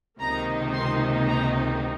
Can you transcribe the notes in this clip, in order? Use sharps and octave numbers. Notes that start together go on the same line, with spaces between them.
C#2 C3 D#3 A#3 D#4 A#5
C6
A#5